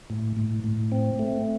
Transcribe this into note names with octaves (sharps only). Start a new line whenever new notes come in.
A2
A2
A2
C4
A3